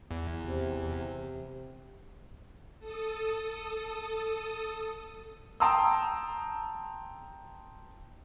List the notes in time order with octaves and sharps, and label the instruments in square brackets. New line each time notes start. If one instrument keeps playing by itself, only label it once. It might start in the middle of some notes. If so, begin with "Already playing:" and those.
[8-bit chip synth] E2
[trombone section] C3
[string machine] A4 D#6
[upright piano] G5 A5 A#5 C6 D#6 E6